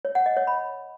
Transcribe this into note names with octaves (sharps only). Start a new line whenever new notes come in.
C#5
F#5
D#5
C#5
B5